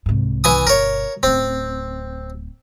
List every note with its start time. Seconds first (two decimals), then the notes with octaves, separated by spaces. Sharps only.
0.06 C2 G#2
0.44 E3 G#5 D#6
0.67 G1 B2 A#4 C#5
1.23 D1 C4 C#4